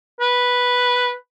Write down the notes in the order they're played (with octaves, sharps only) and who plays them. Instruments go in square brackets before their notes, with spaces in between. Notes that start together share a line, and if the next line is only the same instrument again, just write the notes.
[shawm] B4